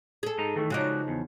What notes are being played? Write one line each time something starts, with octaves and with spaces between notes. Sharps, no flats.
G#4 A4
G#2 D#5 A#5
D#3 E3 A3
C#3 F3 G#3 D#4 F#4 D5
E2